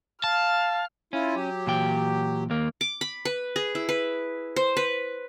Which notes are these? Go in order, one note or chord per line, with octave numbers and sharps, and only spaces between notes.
F5 A5 F6
C#4 E4 F4
F#3 G4
A#2 E3 G5
D#2 A#3
D6
B5
B4
G#4
E4
B4
C5
B4